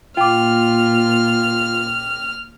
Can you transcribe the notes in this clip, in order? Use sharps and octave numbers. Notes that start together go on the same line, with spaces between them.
A#2 F4 G5 D6 F6